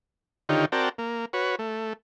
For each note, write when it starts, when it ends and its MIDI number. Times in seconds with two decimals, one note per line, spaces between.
0.49 0.65 50
0.49 0.65 51
0.49 0.65 63
0.49 0.65 65
0.49 0.65 67
0.49 0.65 73
0.72 0.89 60
0.72 0.89 66
0.72 0.89 70
0.72 0.89 74
0.72 0.89 79
0.72 0.89 81
0.98 1.25 58
1.33 1.56 66
1.33 1.56 71
1.33 1.56 73
1.59 1.93 57